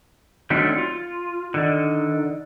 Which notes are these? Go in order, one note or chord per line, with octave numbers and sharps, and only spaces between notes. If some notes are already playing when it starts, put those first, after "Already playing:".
D3 D#3 F#3 G3 A3 C4
F4
D3 D#3